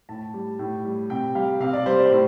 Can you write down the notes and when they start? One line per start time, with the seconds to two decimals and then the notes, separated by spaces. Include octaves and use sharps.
0.09 A2 A5
0.34 G3
0.59 A2
0.85 G3
1.10 C3 G5
1.35 G3 F5
1.60 C3 F5
1.73 D5
1.86 G3 C5
1.99 D5
2.06 C5
2.12 A2